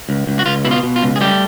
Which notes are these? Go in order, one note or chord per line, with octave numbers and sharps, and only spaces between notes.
C#2
C#2
F#4
C#2 F4
B2 E4
F4
B2
F4
C#2
G#4
G3 A3 G4